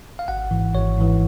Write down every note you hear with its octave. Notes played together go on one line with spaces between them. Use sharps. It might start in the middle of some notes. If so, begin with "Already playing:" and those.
F5
G#1 F#5
G#2 E3
G#1 C#5
G#2 E3